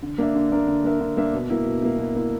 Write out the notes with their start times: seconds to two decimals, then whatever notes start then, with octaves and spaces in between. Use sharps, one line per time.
0.03 D3
0.18 A#3 D4 A#4 E5
0.35 D3
0.51 A#3 D4 A#4 E5
0.67 D3
0.84 A#3 D4 A#4 E5
1.00 D3
1.17 A#3 D4 A#4 E5
1.33 B2
1.50 A#3 E4
1.66 B2
1.82 A#3 E4
1.98 B2
2.15 A#3 E4